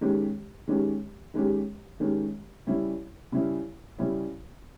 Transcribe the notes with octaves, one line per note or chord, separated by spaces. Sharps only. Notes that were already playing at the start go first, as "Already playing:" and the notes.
D#3 G#3 C#4 G4
D#3 G#3 C#4 G4
D#3 G#3 C#4 G4
D#3 G#3 C#4 G4
C#3 G3 C#4 E4
C#3 G3 C#4 E4
C#3 G3 C#4 E4